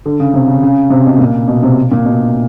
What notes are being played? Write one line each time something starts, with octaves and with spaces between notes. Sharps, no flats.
D3
C#3
C3
C#3
C#3
C3
B2
A#2
B2
C3
A#2
B2